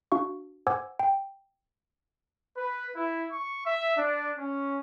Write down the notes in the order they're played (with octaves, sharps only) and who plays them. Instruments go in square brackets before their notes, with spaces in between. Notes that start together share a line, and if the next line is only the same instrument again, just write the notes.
[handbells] D4 F#4 F5 C#6
C5 F#5 G#5 D6 E6 G#6
G5
[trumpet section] B4
E4
C#6
E5
D4
C#4